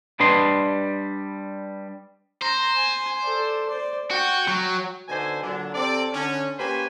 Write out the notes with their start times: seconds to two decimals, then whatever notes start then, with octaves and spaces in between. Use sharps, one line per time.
0.20 G3 D4 B4 D#5 C6
2.42 C5 A#5
2.76 G#5
3.22 A4 D5
3.67 C5 D5
4.11 F#4 G5
4.48 F#3
5.08 B2 D3 D#4 C5 G#5
5.42 A#2 D3 F#3 D4
5.74 C3 C4 A4 D5
6.13 D3 C#4
6.58 A#3 C#4 G4 B4 C5 G#5